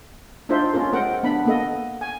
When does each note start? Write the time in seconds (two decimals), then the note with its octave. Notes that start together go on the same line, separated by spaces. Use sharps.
0.49 D4 D#4 F4 C5 E5
0.73 C4 C#4 F4 A#4
0.93 G#3 C4 A#4 F#5 G5
1.23 B3 D4 B5
1.45 A#3 B3 A4 D#5
2.01 G#5